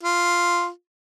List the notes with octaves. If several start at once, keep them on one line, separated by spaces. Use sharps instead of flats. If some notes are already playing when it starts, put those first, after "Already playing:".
F4